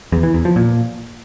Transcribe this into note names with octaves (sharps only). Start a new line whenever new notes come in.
E2
E3
E2
F3
A#2